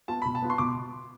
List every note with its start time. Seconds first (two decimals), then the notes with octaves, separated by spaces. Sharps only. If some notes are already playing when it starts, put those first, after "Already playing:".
0.08 B3 F4 A5
0.22 B2 B5
0.35 A5
0.42 B3 F4
0.50 C6
0.58 B2 D6